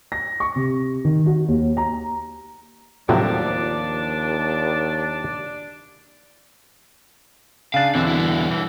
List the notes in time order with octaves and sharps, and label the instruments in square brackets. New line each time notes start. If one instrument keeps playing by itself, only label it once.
[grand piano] A#6
C#6
C3
D#3
F#4
D#2
A#5
[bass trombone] D#2 [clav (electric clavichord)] A2 C3 F#3 [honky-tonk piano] F3 [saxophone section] D4 D5
[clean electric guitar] C#3 D4 [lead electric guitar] F5
[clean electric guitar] E2 B2 D3 [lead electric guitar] C4
[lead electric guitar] G2 E4
[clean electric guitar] E3